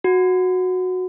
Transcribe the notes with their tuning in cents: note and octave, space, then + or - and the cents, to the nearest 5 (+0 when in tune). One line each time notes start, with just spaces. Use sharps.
F#4 -10